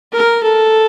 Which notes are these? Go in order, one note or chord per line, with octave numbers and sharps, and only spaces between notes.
A#4
A4